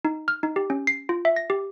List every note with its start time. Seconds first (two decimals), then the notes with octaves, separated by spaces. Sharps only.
0.05 D#4
0.28 F6
0.43 D#4
0.56 G4
0.70 C#4
0.87 C7
1.09 F4
1.25 E5
1.36 A#6
1.50 G4